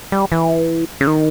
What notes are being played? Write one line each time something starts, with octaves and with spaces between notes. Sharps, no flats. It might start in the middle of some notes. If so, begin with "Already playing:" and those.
G3
E3
C#3
D#3